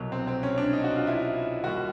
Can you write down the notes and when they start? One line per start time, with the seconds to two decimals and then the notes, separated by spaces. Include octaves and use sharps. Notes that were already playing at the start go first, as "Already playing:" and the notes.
Already playing: C2 B2 F#3
0.12 C4
0.27 C4
0.43 C#4
0.58 D4
0.73 D#4
0.84 F#4
0.96 F4
1.07 E4
1.63 D#2 D#3 G3 F#4